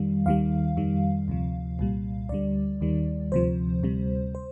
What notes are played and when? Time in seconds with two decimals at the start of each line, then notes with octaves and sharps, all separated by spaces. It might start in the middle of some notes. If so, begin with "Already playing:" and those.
Already playing: F2 D#3 G3 F5
0.26 D#2 D#3 G3 F5
0.77 F2 D#3 G3
1.28 D2 C3 F3
1.79 C2 A#2 G3
2.29 D2 D3 G3 D5
2.81 D#2 D#3 G3
3.32 D2 C3 F3 C5
3.83 D2 C3 G3
4.35 C5